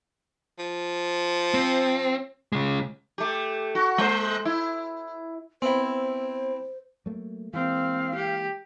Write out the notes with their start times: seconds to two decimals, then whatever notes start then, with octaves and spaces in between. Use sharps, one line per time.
0.58 F3
1.54 C4
2.52 C#3 G#3
3.18 A3 G4
3.75 F#4
3.98 G#3 C5
4.45 E4
5.62 B3 C4 E4 C5
7.06 F#3 A3 A#3
7.53 E3 G#3 A#3 C4 F5
8.15 G4